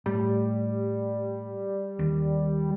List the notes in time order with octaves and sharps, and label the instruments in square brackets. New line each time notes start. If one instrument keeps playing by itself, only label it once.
[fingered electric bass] A2 [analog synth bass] G3
[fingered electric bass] D#2